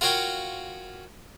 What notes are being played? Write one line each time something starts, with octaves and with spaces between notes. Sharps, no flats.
F4 F#4 A#4 C#5 F5 G5